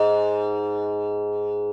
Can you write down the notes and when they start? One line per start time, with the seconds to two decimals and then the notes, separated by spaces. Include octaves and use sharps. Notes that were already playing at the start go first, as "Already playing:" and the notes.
Already playing: G#2